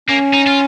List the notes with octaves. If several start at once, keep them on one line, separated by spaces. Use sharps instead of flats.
A#3 C#4
D#4
F4